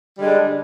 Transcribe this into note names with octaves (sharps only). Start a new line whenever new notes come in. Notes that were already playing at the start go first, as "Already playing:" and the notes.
D3 G3 G#3 D4